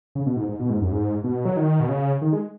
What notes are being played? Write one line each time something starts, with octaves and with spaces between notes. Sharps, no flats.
C#3
B2
G#2
G#2
B2
G#2
F#2
G#2
B2
F#3
D#3
B2
C#3
D#3
G#3